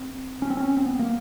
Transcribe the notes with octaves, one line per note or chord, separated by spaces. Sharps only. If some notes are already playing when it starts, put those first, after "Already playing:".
Already playing: C4
C#4
C4
C#4
C4
B3
A#3